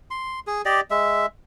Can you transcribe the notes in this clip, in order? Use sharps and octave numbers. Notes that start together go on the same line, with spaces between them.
C6
G#4
G4 D5 D#5
G#3 E5